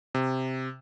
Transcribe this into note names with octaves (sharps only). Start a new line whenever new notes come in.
C3